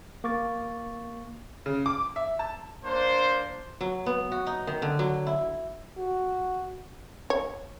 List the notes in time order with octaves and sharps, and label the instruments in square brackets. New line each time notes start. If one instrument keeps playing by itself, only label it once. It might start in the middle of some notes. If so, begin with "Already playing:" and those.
[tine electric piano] A#3 C#6 D6 A6
[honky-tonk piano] C#3
D6
E5
A5
[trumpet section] A#3 D4 C5
[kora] F#3
B3
F#4
D#4
D#3
D3
F#3
E4
[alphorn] F#4
[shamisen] C#5